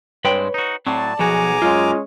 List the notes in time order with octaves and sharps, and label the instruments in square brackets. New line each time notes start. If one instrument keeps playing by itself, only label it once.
[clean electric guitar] G2 G#3 C4 [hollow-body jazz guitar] B4 C#5 G5
[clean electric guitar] D#4 F#4
[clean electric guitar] A2 F#3 [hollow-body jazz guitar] C4 [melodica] D5 A5
[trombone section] B1 G#4 [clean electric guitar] B2 F#4 [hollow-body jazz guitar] F3 [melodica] G#5 A#5 D6
[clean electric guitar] F#2 [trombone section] G#3 C#4 [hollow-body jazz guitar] F4